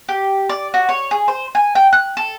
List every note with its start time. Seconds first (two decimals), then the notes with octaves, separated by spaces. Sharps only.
0.09 G4
0.49 D5
0.74 F#4
0.89 C#5
1.11 G#4
1.28 C5
1.55 G#5
1.75 G5
1.93 F#6
2.17 A4